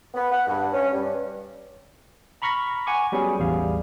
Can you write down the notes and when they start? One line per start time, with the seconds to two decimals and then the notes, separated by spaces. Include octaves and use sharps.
0.15 B3
0.32 F#5
0.48 G2
0.73 C#4
0.93 G2
2.42 A#5 B5 C#6 F6 A#6 B6
2.87 F#5 G#5 C#6 D6
3.12 F#3 G3 B3 C#4 F#4 G#4
3.39 A1 E2 G3 G#4 F5